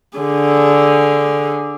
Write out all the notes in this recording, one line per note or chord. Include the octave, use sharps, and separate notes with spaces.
D3 G#4